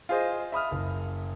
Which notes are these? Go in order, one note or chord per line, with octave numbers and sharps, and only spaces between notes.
F4 G#4 C5 D#5
E5 B5 D#6 F6
F#1